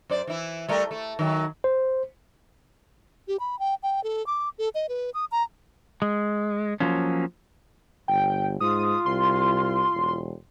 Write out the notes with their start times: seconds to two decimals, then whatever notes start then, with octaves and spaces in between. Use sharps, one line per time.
0.10 F#2 C5 D5
0.27 E3 E4
0.68 G3 A3 A#4
0.91 A3
1.19 D#3 F#3
1.64 C5
3.28 G4
3.40 B5
3.59 G5
3.83 G5
4.04 A4
4.27 D6
4.58 A4
4.75 D#5
4.89 B4
5.14 D#6
5.32 A#5
6.02 G#3
6.80 F3 F#3 A#3 C#4
8.08 G1 G5
8.61 G#2 F4 D#6
9.06 C2 C6
9.94 E1